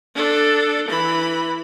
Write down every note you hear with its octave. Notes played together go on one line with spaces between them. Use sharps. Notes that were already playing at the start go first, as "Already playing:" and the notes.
D4 A4
E3 B5